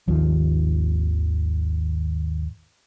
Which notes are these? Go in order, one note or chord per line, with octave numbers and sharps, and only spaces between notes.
G#1 D#2 F3